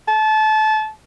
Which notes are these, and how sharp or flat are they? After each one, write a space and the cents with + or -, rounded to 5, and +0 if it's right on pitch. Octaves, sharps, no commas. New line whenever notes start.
A5 -25